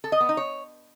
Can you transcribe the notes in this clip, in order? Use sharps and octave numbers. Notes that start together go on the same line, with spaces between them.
A4
D#5
B3
D#4
C#5